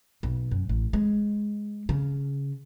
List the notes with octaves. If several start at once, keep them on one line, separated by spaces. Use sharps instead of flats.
B1
F#2
A1
G#3
C#3